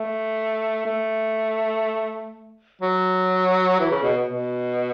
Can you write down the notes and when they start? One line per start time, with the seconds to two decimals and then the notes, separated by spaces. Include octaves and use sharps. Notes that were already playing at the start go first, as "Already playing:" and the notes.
Already playing: A3
0.85 A3
2.82 F#3
3.80 E3
3.91 C#3
4.03 B2
4.29 B2